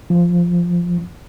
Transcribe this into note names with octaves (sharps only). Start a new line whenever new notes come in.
F3